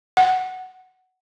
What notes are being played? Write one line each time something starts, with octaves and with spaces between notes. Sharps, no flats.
F#5